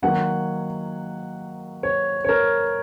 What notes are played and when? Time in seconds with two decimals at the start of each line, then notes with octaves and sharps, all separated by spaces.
0.02 D#3 F#3 A#3 F#5
1.83 C#5
2.25 C#5
2.29 A#4